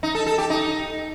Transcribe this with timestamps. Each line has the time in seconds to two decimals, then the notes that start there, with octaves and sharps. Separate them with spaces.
0.03 D#4
0.15 A4
0.27 A4
0.38 G4
0.50 D#4